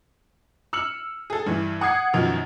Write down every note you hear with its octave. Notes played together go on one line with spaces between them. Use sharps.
E6 F6 C#7 F#7
G#4 A4
G2 E3
F#5 D#6 G#6 C7
F#2 B2 D#3 F3